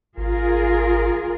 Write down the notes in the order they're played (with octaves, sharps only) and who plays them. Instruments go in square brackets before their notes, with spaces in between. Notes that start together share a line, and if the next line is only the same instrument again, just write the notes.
[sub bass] G#1 [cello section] F4 G#4 A#4